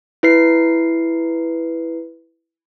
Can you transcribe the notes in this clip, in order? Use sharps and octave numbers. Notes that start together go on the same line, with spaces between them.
E4 B4 C7